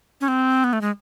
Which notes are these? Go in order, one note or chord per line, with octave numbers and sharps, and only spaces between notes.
C#4
C4
B3
A3
G#3